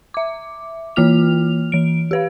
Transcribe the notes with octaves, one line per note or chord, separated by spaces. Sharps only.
E5 D6
E3 A#3 F4 F6 F7
E3 D7
G4 B4 F5